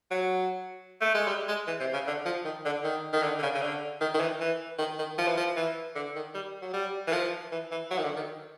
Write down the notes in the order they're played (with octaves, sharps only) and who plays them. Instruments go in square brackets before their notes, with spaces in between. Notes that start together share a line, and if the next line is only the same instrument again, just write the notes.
[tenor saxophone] F#3
A3
G#3
G3
G#3
E3
C3
C#3
D3
F3
D#3
D3
D#3
D#3
D3
D3
C#3
C#3
D3
D#3
D#3
E3
E3
D#3
D#3
F3
E3
F3
E3
D3
D#3
G3
F#3
G3
E3
F3
E3
E3
F#3
D#3
D3
D#3